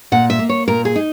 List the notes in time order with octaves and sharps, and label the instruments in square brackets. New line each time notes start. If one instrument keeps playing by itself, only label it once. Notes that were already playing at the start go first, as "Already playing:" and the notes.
[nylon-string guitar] A#2 F#5
E5
A#3
C#5
A#2 A#4
G#4
D#4